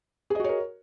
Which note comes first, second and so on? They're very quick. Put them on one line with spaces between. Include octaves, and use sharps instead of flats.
G#4 D#5 F#4 C#5 A#4